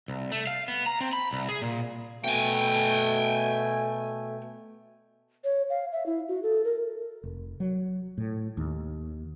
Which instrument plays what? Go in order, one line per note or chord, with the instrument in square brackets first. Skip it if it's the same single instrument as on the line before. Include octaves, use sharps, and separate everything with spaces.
[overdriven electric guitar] C2
A3
F5
B3
A#5
C4
B5
C2
G#4
A#2
[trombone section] B2 A3 [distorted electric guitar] G5 G#5
[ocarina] C#5
F5
E5
E4
F#4
A4
A#4
[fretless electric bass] F1
F#3
A2
D#2